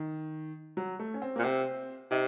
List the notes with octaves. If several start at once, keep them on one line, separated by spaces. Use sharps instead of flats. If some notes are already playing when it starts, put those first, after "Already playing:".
Already playing: D#3
F#3
A3
C#4
C4
A#2 A#3
C3 C4
C3 D#4